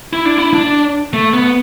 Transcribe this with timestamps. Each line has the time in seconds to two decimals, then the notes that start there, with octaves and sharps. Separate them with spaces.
0.13 E4
0.25 D4
0.38 E4
0.54 D4
1.13 A3
1.34 B3